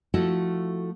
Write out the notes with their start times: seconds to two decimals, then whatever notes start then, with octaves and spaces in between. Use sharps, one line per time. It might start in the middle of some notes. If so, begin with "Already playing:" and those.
0.14 F3 A3 E4 F#4 A4